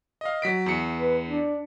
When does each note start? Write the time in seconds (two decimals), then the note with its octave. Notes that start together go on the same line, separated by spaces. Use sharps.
0.21 D#5 F5
0.42 F#3 B6 D7
0.66 E2 C#7
0.98 B4
1.26 D4